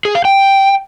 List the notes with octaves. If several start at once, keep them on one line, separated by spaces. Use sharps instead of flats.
G#4
F5
G5